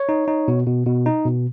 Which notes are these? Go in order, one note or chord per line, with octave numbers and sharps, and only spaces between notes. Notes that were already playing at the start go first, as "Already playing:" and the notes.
Already playing: C#5
D#4
D#4
B2
B2
B2
D#4
B2